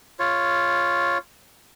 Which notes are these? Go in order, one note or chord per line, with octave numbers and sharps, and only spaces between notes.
F4 C#5